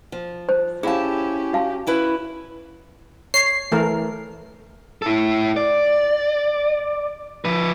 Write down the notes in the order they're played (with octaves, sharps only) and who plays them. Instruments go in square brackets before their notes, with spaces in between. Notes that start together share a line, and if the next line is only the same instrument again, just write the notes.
[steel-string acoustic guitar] F3
[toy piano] C5
[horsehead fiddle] C#4 G4 [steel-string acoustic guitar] E4 A5 [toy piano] G#4 F5
[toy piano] F#4 F5 A5
[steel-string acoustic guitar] C#4 E4 B4
[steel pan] C#5 [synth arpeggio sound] C7
[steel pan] E3 A3 A#4
[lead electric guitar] E4 A4
D5
F3 B4